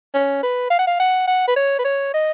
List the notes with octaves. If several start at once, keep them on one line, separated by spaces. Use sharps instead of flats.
C#4
B4
F5
F#5
F5
F#5
F#5
B4
C#5
B4
C#5
D#5